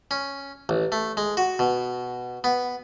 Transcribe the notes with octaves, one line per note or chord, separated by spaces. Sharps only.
C#4
A1
A3
G#3
F#4
B2
B3